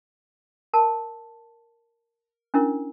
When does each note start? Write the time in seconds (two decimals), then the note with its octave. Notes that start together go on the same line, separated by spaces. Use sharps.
0.73 A#4 A5
2.54 C#4 D4 E4 A#4